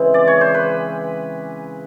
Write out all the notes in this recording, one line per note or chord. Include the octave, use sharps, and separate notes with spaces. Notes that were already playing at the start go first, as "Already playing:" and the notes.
Already playing: C#3 E3 G#3 C4
D5
C#5
C5
B4